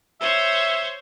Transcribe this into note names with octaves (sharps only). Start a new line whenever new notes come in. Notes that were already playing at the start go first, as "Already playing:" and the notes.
C5 C#5 E5